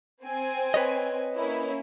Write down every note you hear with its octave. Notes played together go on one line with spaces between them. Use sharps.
C4 G#5
B4 C#5 D#5
A#3 C#4 E4